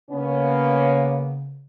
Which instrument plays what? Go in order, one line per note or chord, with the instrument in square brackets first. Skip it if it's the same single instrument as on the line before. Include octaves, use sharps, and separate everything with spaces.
[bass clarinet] C#3 [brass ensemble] A#3 B3 C#4